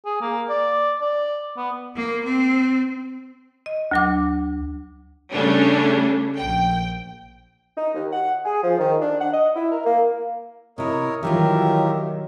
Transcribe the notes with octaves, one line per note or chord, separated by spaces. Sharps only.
G#4
A#3
D5
D5
B3
A#3
C4
D#5
D2 F#3 D6
C#3 G3 A3 C#4 D4
A#1 G5
D#4
D#2
F#5
G#4
F3
D#3
D4
F#5
D#5
E4
A#4
A#3
C3 E4 A#4 C#5 D#5
D#3 E3 F#3 G3 F4 G4 A#4 E5